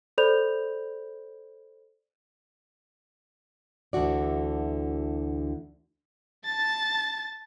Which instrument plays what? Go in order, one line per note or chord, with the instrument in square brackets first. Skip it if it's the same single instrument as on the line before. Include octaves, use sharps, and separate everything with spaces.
[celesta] A4 C5 D5 B5 G6 F7
[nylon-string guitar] D2 D3 E3 F#4 D5
[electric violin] A5 A6